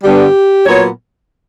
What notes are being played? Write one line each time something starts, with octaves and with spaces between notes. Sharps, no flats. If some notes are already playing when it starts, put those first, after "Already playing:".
G2 D3 G3 B3 G4
A#2 F#3 B3 C#5